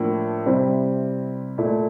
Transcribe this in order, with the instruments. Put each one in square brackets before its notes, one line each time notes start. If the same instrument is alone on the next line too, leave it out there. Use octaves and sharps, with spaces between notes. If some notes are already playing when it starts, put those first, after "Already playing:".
Already playing: [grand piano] A2 F3 A#3 D4
C3 G3 C4 E4
A#2 A3 E4